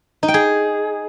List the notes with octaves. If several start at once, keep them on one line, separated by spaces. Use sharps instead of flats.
D#4
G5
G#4